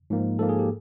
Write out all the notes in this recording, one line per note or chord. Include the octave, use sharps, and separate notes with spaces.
G#2 F3 A#3
G#2 F3 A#3 A4
G#4
G4